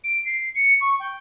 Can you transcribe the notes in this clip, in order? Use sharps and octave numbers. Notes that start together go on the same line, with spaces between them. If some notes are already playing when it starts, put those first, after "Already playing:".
D7
C7
C#7
C#6
G5